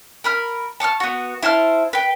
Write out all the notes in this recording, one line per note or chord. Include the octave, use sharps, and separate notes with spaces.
A#4 B5 F6
A5 C#6 D6 F6
B3 F#4
E4 C5 A5 F6
B4 G5